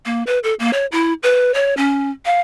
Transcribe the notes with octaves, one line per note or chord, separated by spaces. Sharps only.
A#3
B4
A4
A#3
C#5
E4
B4
C#5
C#4
F5